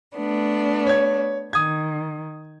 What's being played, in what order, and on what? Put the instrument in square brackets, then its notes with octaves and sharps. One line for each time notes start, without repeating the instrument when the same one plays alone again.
[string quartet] A3 B3 D4
[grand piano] C#5 G#6
[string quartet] D#3 [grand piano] D#6 G#6